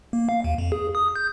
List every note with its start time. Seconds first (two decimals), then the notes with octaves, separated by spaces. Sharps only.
0.13 A#3
0.29 F5
0.44 D#2
0.58 F2
0.72 G#4
0.95 D#6
1.16 G6